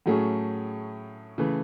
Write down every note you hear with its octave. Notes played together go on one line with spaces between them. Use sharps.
A2 F#3 A3 C#4 G#4
C#3 E3 A3